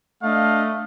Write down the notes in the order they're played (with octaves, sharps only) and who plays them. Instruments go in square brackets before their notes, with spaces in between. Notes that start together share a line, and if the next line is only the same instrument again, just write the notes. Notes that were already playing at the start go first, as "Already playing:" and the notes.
[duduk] A3 [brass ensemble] D4 D#5 F5